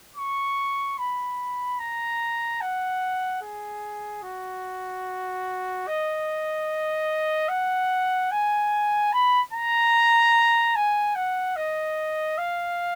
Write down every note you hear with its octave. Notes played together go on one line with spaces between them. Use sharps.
C#6
B5
A#5
F#5
G#4
F#4
D#5
F#5
G#5
B5
A#5
G#5
F#5
D#5
F5